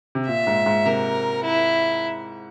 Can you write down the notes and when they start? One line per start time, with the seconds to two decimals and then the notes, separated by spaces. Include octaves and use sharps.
0.15 C3
0.27 A#2 E5
0.47 G#2
0.66 G#2
0.85 C3 A#4
1.44 E4